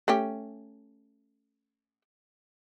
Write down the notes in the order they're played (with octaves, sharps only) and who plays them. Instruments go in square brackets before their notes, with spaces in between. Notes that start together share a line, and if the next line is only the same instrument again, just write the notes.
[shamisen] A3 C#4 G4